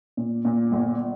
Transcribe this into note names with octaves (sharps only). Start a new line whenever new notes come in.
A#2
A#2
G1